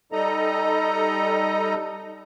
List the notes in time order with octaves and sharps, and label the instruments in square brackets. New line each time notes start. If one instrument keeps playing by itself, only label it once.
[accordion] G3 D#4 A4 D#5 A#5